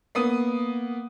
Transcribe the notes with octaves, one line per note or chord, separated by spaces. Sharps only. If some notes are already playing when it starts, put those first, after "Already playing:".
A#3 B3 D#6 D#7